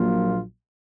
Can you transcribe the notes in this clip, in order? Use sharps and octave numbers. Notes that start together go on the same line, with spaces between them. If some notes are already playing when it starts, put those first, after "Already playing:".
Already playing: A#1 A#2 F#3 A#3 F4